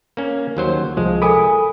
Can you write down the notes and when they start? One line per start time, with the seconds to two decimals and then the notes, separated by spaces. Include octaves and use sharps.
0.17 A#3 C#4
0.57 D#2 F#3 C5
0.97 C2 F3 G#3
1.22 A4 A#4 G#5 B5 D#6